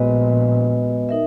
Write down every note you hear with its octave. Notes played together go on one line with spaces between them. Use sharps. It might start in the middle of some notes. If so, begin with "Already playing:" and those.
Already playing: A#1 A#2 G#3 B3 F#4 B4 D#5
D#4 A#4 E5